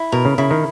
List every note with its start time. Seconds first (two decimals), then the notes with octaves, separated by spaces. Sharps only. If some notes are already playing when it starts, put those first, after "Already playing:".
Already playing: E4
0.12 B2 A#4
0.25 C#3
0.38 C#3 E4
0.51 D#3